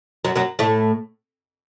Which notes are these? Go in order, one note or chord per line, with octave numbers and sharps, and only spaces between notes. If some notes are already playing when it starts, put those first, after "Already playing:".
F#2 F#3
F#2 F#3
A2 A3